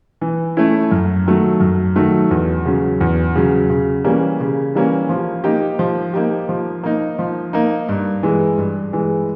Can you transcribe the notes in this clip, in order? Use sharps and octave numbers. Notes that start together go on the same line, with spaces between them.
E3
A3 C#4 E4
F#2
D#3 F#3 A3
F#2
D#3 F#3 A3
E2
C#3 F#3
E2
C#3 F#3
C#3
E3 G3 A#3 C#4
C#3
E3 G3 A#3 C#4
F3
A#3 D#4 G4
F3
A#3 D#4 G4
F3
A#3 D#4
F3
A#3 D#4
G2
E3 G#3
G2
E3 G#3